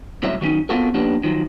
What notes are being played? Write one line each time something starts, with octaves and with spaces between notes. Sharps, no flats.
C2 A2 F#3 C#4 C#5 E5
D#3 F#3 G#3 C#4 D#4
B3 C4 F4 F#4 A4 A#4
F3 A#3 B3 C#4 D4 G4
D#3 F3 F#3